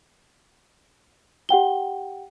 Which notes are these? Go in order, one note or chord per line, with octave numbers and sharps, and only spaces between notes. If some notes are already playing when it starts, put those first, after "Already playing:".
G4 F#5 G5 G7